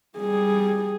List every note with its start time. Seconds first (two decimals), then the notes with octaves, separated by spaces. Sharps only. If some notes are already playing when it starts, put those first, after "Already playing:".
0.18 G3 G#4